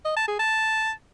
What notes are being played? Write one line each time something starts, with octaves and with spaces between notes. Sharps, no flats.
D#5
A5
G#4
A5